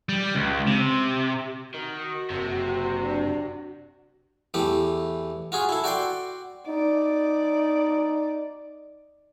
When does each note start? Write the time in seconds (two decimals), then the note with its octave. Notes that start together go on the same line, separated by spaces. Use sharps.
0.09 G3
0.35 C#2
0.67 C3
1.74 D#3 F#4
2.30 F#1 C3
2.97 D4
4.54 E2 E3 A3 G4
5.52 F4 F#4 G#4
5.69 E4 A4
5.84 F#4 D5 G5 C6
6.68 D#4 D5